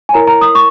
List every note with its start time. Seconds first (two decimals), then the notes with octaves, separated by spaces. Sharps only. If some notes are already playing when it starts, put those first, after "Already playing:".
0.09 G#5
0.13 E4 A#4 C#5 A#5
0.27 A#5
0.41 D#6
0.55 C#6